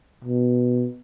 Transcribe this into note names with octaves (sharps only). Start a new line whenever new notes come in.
B2